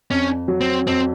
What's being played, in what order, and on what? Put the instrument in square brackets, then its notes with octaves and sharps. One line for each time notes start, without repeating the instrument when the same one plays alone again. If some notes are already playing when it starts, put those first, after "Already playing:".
[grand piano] F2 [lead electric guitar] C#4
[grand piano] F#3
[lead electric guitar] C4
[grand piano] F2 [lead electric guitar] C4